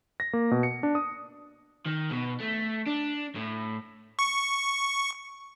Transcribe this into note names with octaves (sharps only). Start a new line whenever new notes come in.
A#6
A#3
B2
C#7
D4
D#6
D#3
B2
A3
D4
A2
C#6